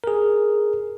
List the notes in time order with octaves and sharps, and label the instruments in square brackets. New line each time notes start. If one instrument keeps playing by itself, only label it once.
[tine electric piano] G#4 A#4